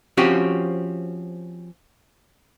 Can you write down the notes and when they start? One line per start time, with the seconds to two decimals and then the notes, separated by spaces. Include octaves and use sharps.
0.17 F3 C4 C#4 F#4 G4